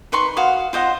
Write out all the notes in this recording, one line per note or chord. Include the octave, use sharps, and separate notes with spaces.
D#4 B4 C6 C#6
F#4 F5 C6 D#6
F4 C5 D#5 F#5